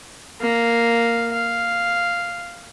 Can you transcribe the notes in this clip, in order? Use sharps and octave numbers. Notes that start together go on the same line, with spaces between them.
A#3 F5
F5